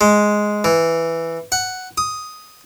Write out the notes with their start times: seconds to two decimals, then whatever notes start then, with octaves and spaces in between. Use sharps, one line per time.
0.01 G#3
0.64 E3
1.52 F#5
1.98 D#6